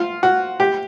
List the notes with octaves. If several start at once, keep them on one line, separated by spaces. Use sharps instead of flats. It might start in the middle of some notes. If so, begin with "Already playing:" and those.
Already playing: F4
F#4
G4